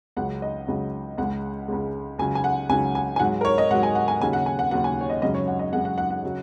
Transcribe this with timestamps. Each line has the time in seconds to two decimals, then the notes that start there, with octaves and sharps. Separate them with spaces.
0.16 C#2 C#3 F#3 F#5
0.42 D#5
0.68 C#2 C#3 F#3
1.18 C#2 C#3 G#3 F#5
1.68 C#2 C#3 G#3
2.18 C#2 C#3 F#3 G#5
2.35 G#5
2.44 F#5
2.69 C#2 C#3 F#3 G#5
2.95 G#5
3.16 G#5
3.19 G#2 F#3 F#5
3.41 A#4
3.45 C#5
3.58 D#5
3.71 G#2 F#5
3.74 F#3
3.83 G#5
3.95 F#5
4.08 G#5
4.21 D#2 C#3 F#3 G#5
4.33 F#5
4.46 G#5
4.59 F#5
4.71 D#2 C#3 F#3 F#5
4.84 G#5
5.01 C#5
5.10 D#5
5.22 F#2 C#3 G#3 D#5
5.34 C#5
5.47 F#5
5.59 D#5
5.72 F#2 C#3 G#3 F#5
5.85 F#5
5.98 F#5
6.10 F#5
6.24 C#3 F#3